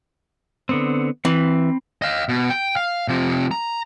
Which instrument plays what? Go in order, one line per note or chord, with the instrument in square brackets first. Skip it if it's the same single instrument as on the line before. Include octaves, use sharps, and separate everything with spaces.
[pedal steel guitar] D3 B3 C4
[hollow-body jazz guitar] E3 [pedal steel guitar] C4 B5
[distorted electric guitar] D#5 F5
B2
G5
F5
C3 F3
A#5